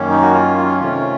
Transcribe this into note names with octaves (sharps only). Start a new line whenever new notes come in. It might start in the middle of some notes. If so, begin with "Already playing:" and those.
Already playing: F#2 D#3 A#3 C#4
D#4
F#4
F4
F4
C3 D#3 A3 C#4 F4